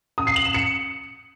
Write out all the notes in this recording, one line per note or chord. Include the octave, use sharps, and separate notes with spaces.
D#6
C7
F#7
E7
C#7